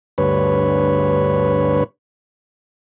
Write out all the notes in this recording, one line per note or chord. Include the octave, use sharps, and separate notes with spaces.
D2 G2 B4 C#5